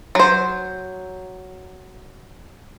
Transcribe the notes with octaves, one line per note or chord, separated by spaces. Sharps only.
F#3 C5